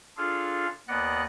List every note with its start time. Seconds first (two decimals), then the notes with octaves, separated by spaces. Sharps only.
0.17 D4 F4 G#4 A4 F5
0.88 D#2 B3 D5 D#5 F#5 F#6